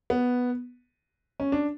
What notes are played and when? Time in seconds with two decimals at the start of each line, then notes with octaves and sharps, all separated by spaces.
0.10 B3
1.40 C#4
1.52 D4